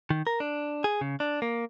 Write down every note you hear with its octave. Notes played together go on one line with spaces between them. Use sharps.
D#3
A#4
D4
G#4
C#3
D4
A#3